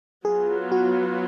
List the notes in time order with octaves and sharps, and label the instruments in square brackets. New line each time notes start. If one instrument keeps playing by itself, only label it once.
[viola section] F#3 B3 F4 [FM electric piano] G#4
[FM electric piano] F#4